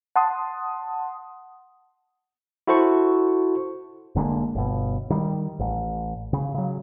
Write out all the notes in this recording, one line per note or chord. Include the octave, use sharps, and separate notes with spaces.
F#5 A5 C6 D#6
E4 F#4 A4 C5 A5 C#6
F1 D3 G#3 A#3
G1 B2
D#3 G3
A1
C#3
C#3 F#3